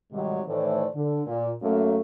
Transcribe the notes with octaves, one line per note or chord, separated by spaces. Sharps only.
G#2 C3 D#3 F#3 G3
A2 D#3 E3 A3 C5 D5
D3
A#2
F#2 A3 A#3